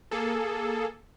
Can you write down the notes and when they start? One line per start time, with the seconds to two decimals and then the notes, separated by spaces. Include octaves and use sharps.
0.11 A#3 G#4 A4